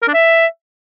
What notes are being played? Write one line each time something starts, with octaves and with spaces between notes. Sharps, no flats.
A#4
D4
E5